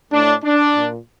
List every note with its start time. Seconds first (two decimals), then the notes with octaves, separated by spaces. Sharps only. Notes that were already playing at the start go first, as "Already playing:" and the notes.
0.12 A2 D4
0.44 D4
0.74 A#2